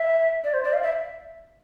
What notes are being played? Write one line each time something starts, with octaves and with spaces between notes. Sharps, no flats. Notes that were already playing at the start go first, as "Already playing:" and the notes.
Already playing: E5
D5
C5
D5
F5
E5